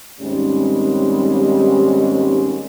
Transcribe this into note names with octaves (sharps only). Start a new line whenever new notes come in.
D#2 G#2 G3 G#3 C4 C#4